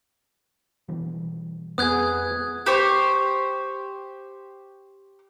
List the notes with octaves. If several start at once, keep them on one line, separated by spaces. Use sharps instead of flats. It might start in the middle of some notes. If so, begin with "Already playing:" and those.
B2 E3 G3
F2 B3 G#4 D#6 F#6 G#6
G4 C5 C#6